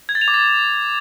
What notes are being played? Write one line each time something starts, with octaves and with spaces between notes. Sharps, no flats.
G#6
A6
F7
D6
A6